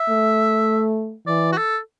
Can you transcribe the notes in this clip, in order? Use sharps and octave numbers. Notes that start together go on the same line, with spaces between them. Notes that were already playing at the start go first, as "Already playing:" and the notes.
Already playing: E5
A3
E3 D5
F#4
A4